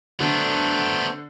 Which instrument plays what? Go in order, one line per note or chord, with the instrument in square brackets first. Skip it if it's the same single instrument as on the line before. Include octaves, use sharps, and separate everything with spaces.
[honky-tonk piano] D3 [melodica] F#3 A3 C5 [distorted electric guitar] B3 D4